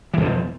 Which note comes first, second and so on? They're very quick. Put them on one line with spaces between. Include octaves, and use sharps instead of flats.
E3 F2 B2 F3